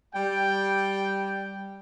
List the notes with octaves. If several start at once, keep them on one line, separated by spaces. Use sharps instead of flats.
G3 G5